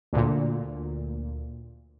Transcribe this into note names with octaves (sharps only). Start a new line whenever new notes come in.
D2 A#2